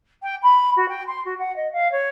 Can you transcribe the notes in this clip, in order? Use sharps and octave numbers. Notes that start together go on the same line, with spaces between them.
G5
B5
F#4
G5
C6
F#4
F#5
D#5
F5
C#5